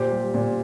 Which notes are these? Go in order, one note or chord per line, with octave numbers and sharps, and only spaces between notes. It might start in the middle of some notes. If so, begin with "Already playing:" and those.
Already playing: A#2 G4 C5
G3
A#2